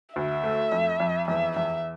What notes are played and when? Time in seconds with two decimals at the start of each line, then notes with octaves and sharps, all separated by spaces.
0.15 D2 E5
0.43 A3
0.72 F2
1.00 F2
1.28 E2 E5
1.56 E2 E5